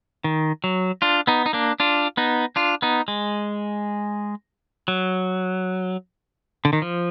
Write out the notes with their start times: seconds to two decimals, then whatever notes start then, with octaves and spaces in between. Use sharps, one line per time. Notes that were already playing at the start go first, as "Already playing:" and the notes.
0.24 D#3
0.64 F#3
1.02 D4 F4
1.27 B3 D#4
1.46 D#4
1.53 A#3 D4
1.80 D4 F4
2.17 B3 D#4
2.56 D4 F4
2.82 B3 D#4
3.08 G#3
4.88 F#3
6.65 D3
6.73 D#3
6.82 F3